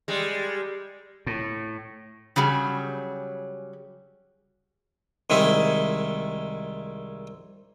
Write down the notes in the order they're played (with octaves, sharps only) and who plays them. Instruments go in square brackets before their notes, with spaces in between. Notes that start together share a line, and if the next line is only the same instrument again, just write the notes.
[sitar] G3 G#3
[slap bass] A2
[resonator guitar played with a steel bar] C#3 F#3 G3 G#4
[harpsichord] C2 D#3 G#3 E4